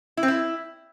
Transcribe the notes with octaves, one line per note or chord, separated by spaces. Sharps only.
E4
C4
E4